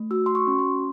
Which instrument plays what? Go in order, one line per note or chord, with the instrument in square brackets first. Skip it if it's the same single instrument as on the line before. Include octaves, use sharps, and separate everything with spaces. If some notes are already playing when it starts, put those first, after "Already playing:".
Already playing: [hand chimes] A3
F#4 E6
C6
C#6
C#4
C6